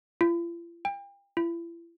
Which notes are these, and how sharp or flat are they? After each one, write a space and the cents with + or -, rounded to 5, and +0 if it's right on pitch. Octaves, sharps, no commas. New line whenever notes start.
F4 -45
G5 +35
E4 +40